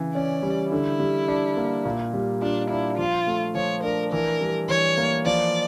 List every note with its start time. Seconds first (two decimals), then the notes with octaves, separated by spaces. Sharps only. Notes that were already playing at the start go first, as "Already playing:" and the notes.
Already playing: C#3 E3
0.15 C#4 D5
0.43 G3
0.71 D3 E4
1.00 G3
1.28 D4
1.57 A#3
1.85 A#2
2.14 G3
2.42 D4 F4
2.70 D4 E4
2.98 F3 F4
3.27 A3
3.55 F3 C#5
3.83 D4 A#4
4.12 E3 A#4
4.41 G3
4.69 E3 C#5
4.98 A#3
5.26 F3 D5